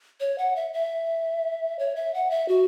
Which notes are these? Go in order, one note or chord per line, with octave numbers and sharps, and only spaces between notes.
C#5
F#5
E5
E5
C#5
E5
F#5
E5
F#4